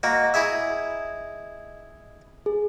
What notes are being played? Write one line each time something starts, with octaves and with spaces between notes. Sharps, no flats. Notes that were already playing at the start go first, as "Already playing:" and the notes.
A#3 F#4 D#5
E4 G#4 E5
G#4